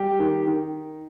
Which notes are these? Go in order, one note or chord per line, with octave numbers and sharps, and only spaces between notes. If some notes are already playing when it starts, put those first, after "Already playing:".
Already playing: G3 G4
D#3
D#3